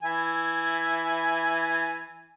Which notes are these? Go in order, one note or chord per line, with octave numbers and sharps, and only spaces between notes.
E3 E4 G#5